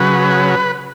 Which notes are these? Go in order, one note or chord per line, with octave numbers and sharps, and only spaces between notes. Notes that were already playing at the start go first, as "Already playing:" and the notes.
Already playing: C#3 F#3 B4